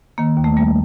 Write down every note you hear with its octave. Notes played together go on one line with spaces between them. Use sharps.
D#3 A#3
D#2
A3
G3 A#3